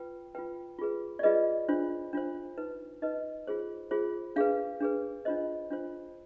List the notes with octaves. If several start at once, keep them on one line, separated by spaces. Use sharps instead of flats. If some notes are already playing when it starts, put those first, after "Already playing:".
Already playing: F4 B4 G5
F4 B4 G5
F4 G#4 B4
D5
F4 G#4 B4 D#5
D4 F4 C5
D4 F4 C5
D#4 B4
D#4 B4 D#5
F4 G#4 C5
F4 G#4 C5
D4 G#4 B4 F5
D4 G#4 B4
D4 F4 C5 D#5
D4 F4 C5